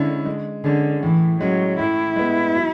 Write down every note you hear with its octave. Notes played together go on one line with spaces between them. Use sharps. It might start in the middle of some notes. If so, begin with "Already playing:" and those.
Already playing: D3 G#3 C#4 E4
G#3
D3 C#4 G#4
A2 E3
F#3 G#3 C#4
A2 E4
G#3 B3
F#3